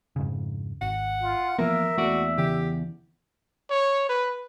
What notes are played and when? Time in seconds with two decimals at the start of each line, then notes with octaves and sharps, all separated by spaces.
0.16 F2 G#2 C#3
0.81 G#1 F#5
1.22 F4
1.59 E3 F3 A#3 B3 A#4 E5
1.98 E2 A3 A#3 F#4 D5
2.38 C#3 E3 G4
3.70 C#5
4.09 B4